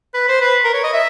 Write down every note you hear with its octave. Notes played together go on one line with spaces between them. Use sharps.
B4
C5
B4
A#4
C#5
D#5
E5